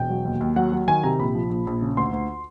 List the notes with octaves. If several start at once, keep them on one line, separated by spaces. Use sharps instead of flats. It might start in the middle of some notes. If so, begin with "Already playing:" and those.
Already playing: E1 G5
F#3
D#2
D#2
F#3 F#5
F#3
D#3 G#5
C3 A#5
A#1 B5
F3
A#1
A#1
C#3
D2 C6
D2